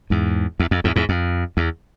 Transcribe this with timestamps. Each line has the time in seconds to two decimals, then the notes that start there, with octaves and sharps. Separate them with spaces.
0.10 E2 G#2
0.60 E2
0.71 F2
0.84 E2 G#2
0.96 E2 G#2
1.09 F2
1.57 E2